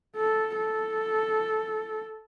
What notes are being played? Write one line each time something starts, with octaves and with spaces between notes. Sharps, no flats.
A4
A4